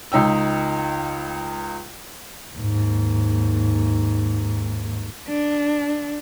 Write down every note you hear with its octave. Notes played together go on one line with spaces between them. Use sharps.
C#2 D#4 G5 E6
D#2 G#2
D4